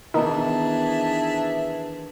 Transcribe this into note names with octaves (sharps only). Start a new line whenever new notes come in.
D#3 E3 B3 D4 D#4 G#4 E5 A5